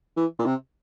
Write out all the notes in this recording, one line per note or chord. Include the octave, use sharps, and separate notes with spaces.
E3
A#2
C3